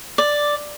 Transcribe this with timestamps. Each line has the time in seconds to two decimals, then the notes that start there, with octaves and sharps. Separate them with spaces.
0.18 D5